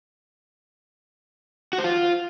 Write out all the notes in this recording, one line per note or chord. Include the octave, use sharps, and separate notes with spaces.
F#4
C5
F4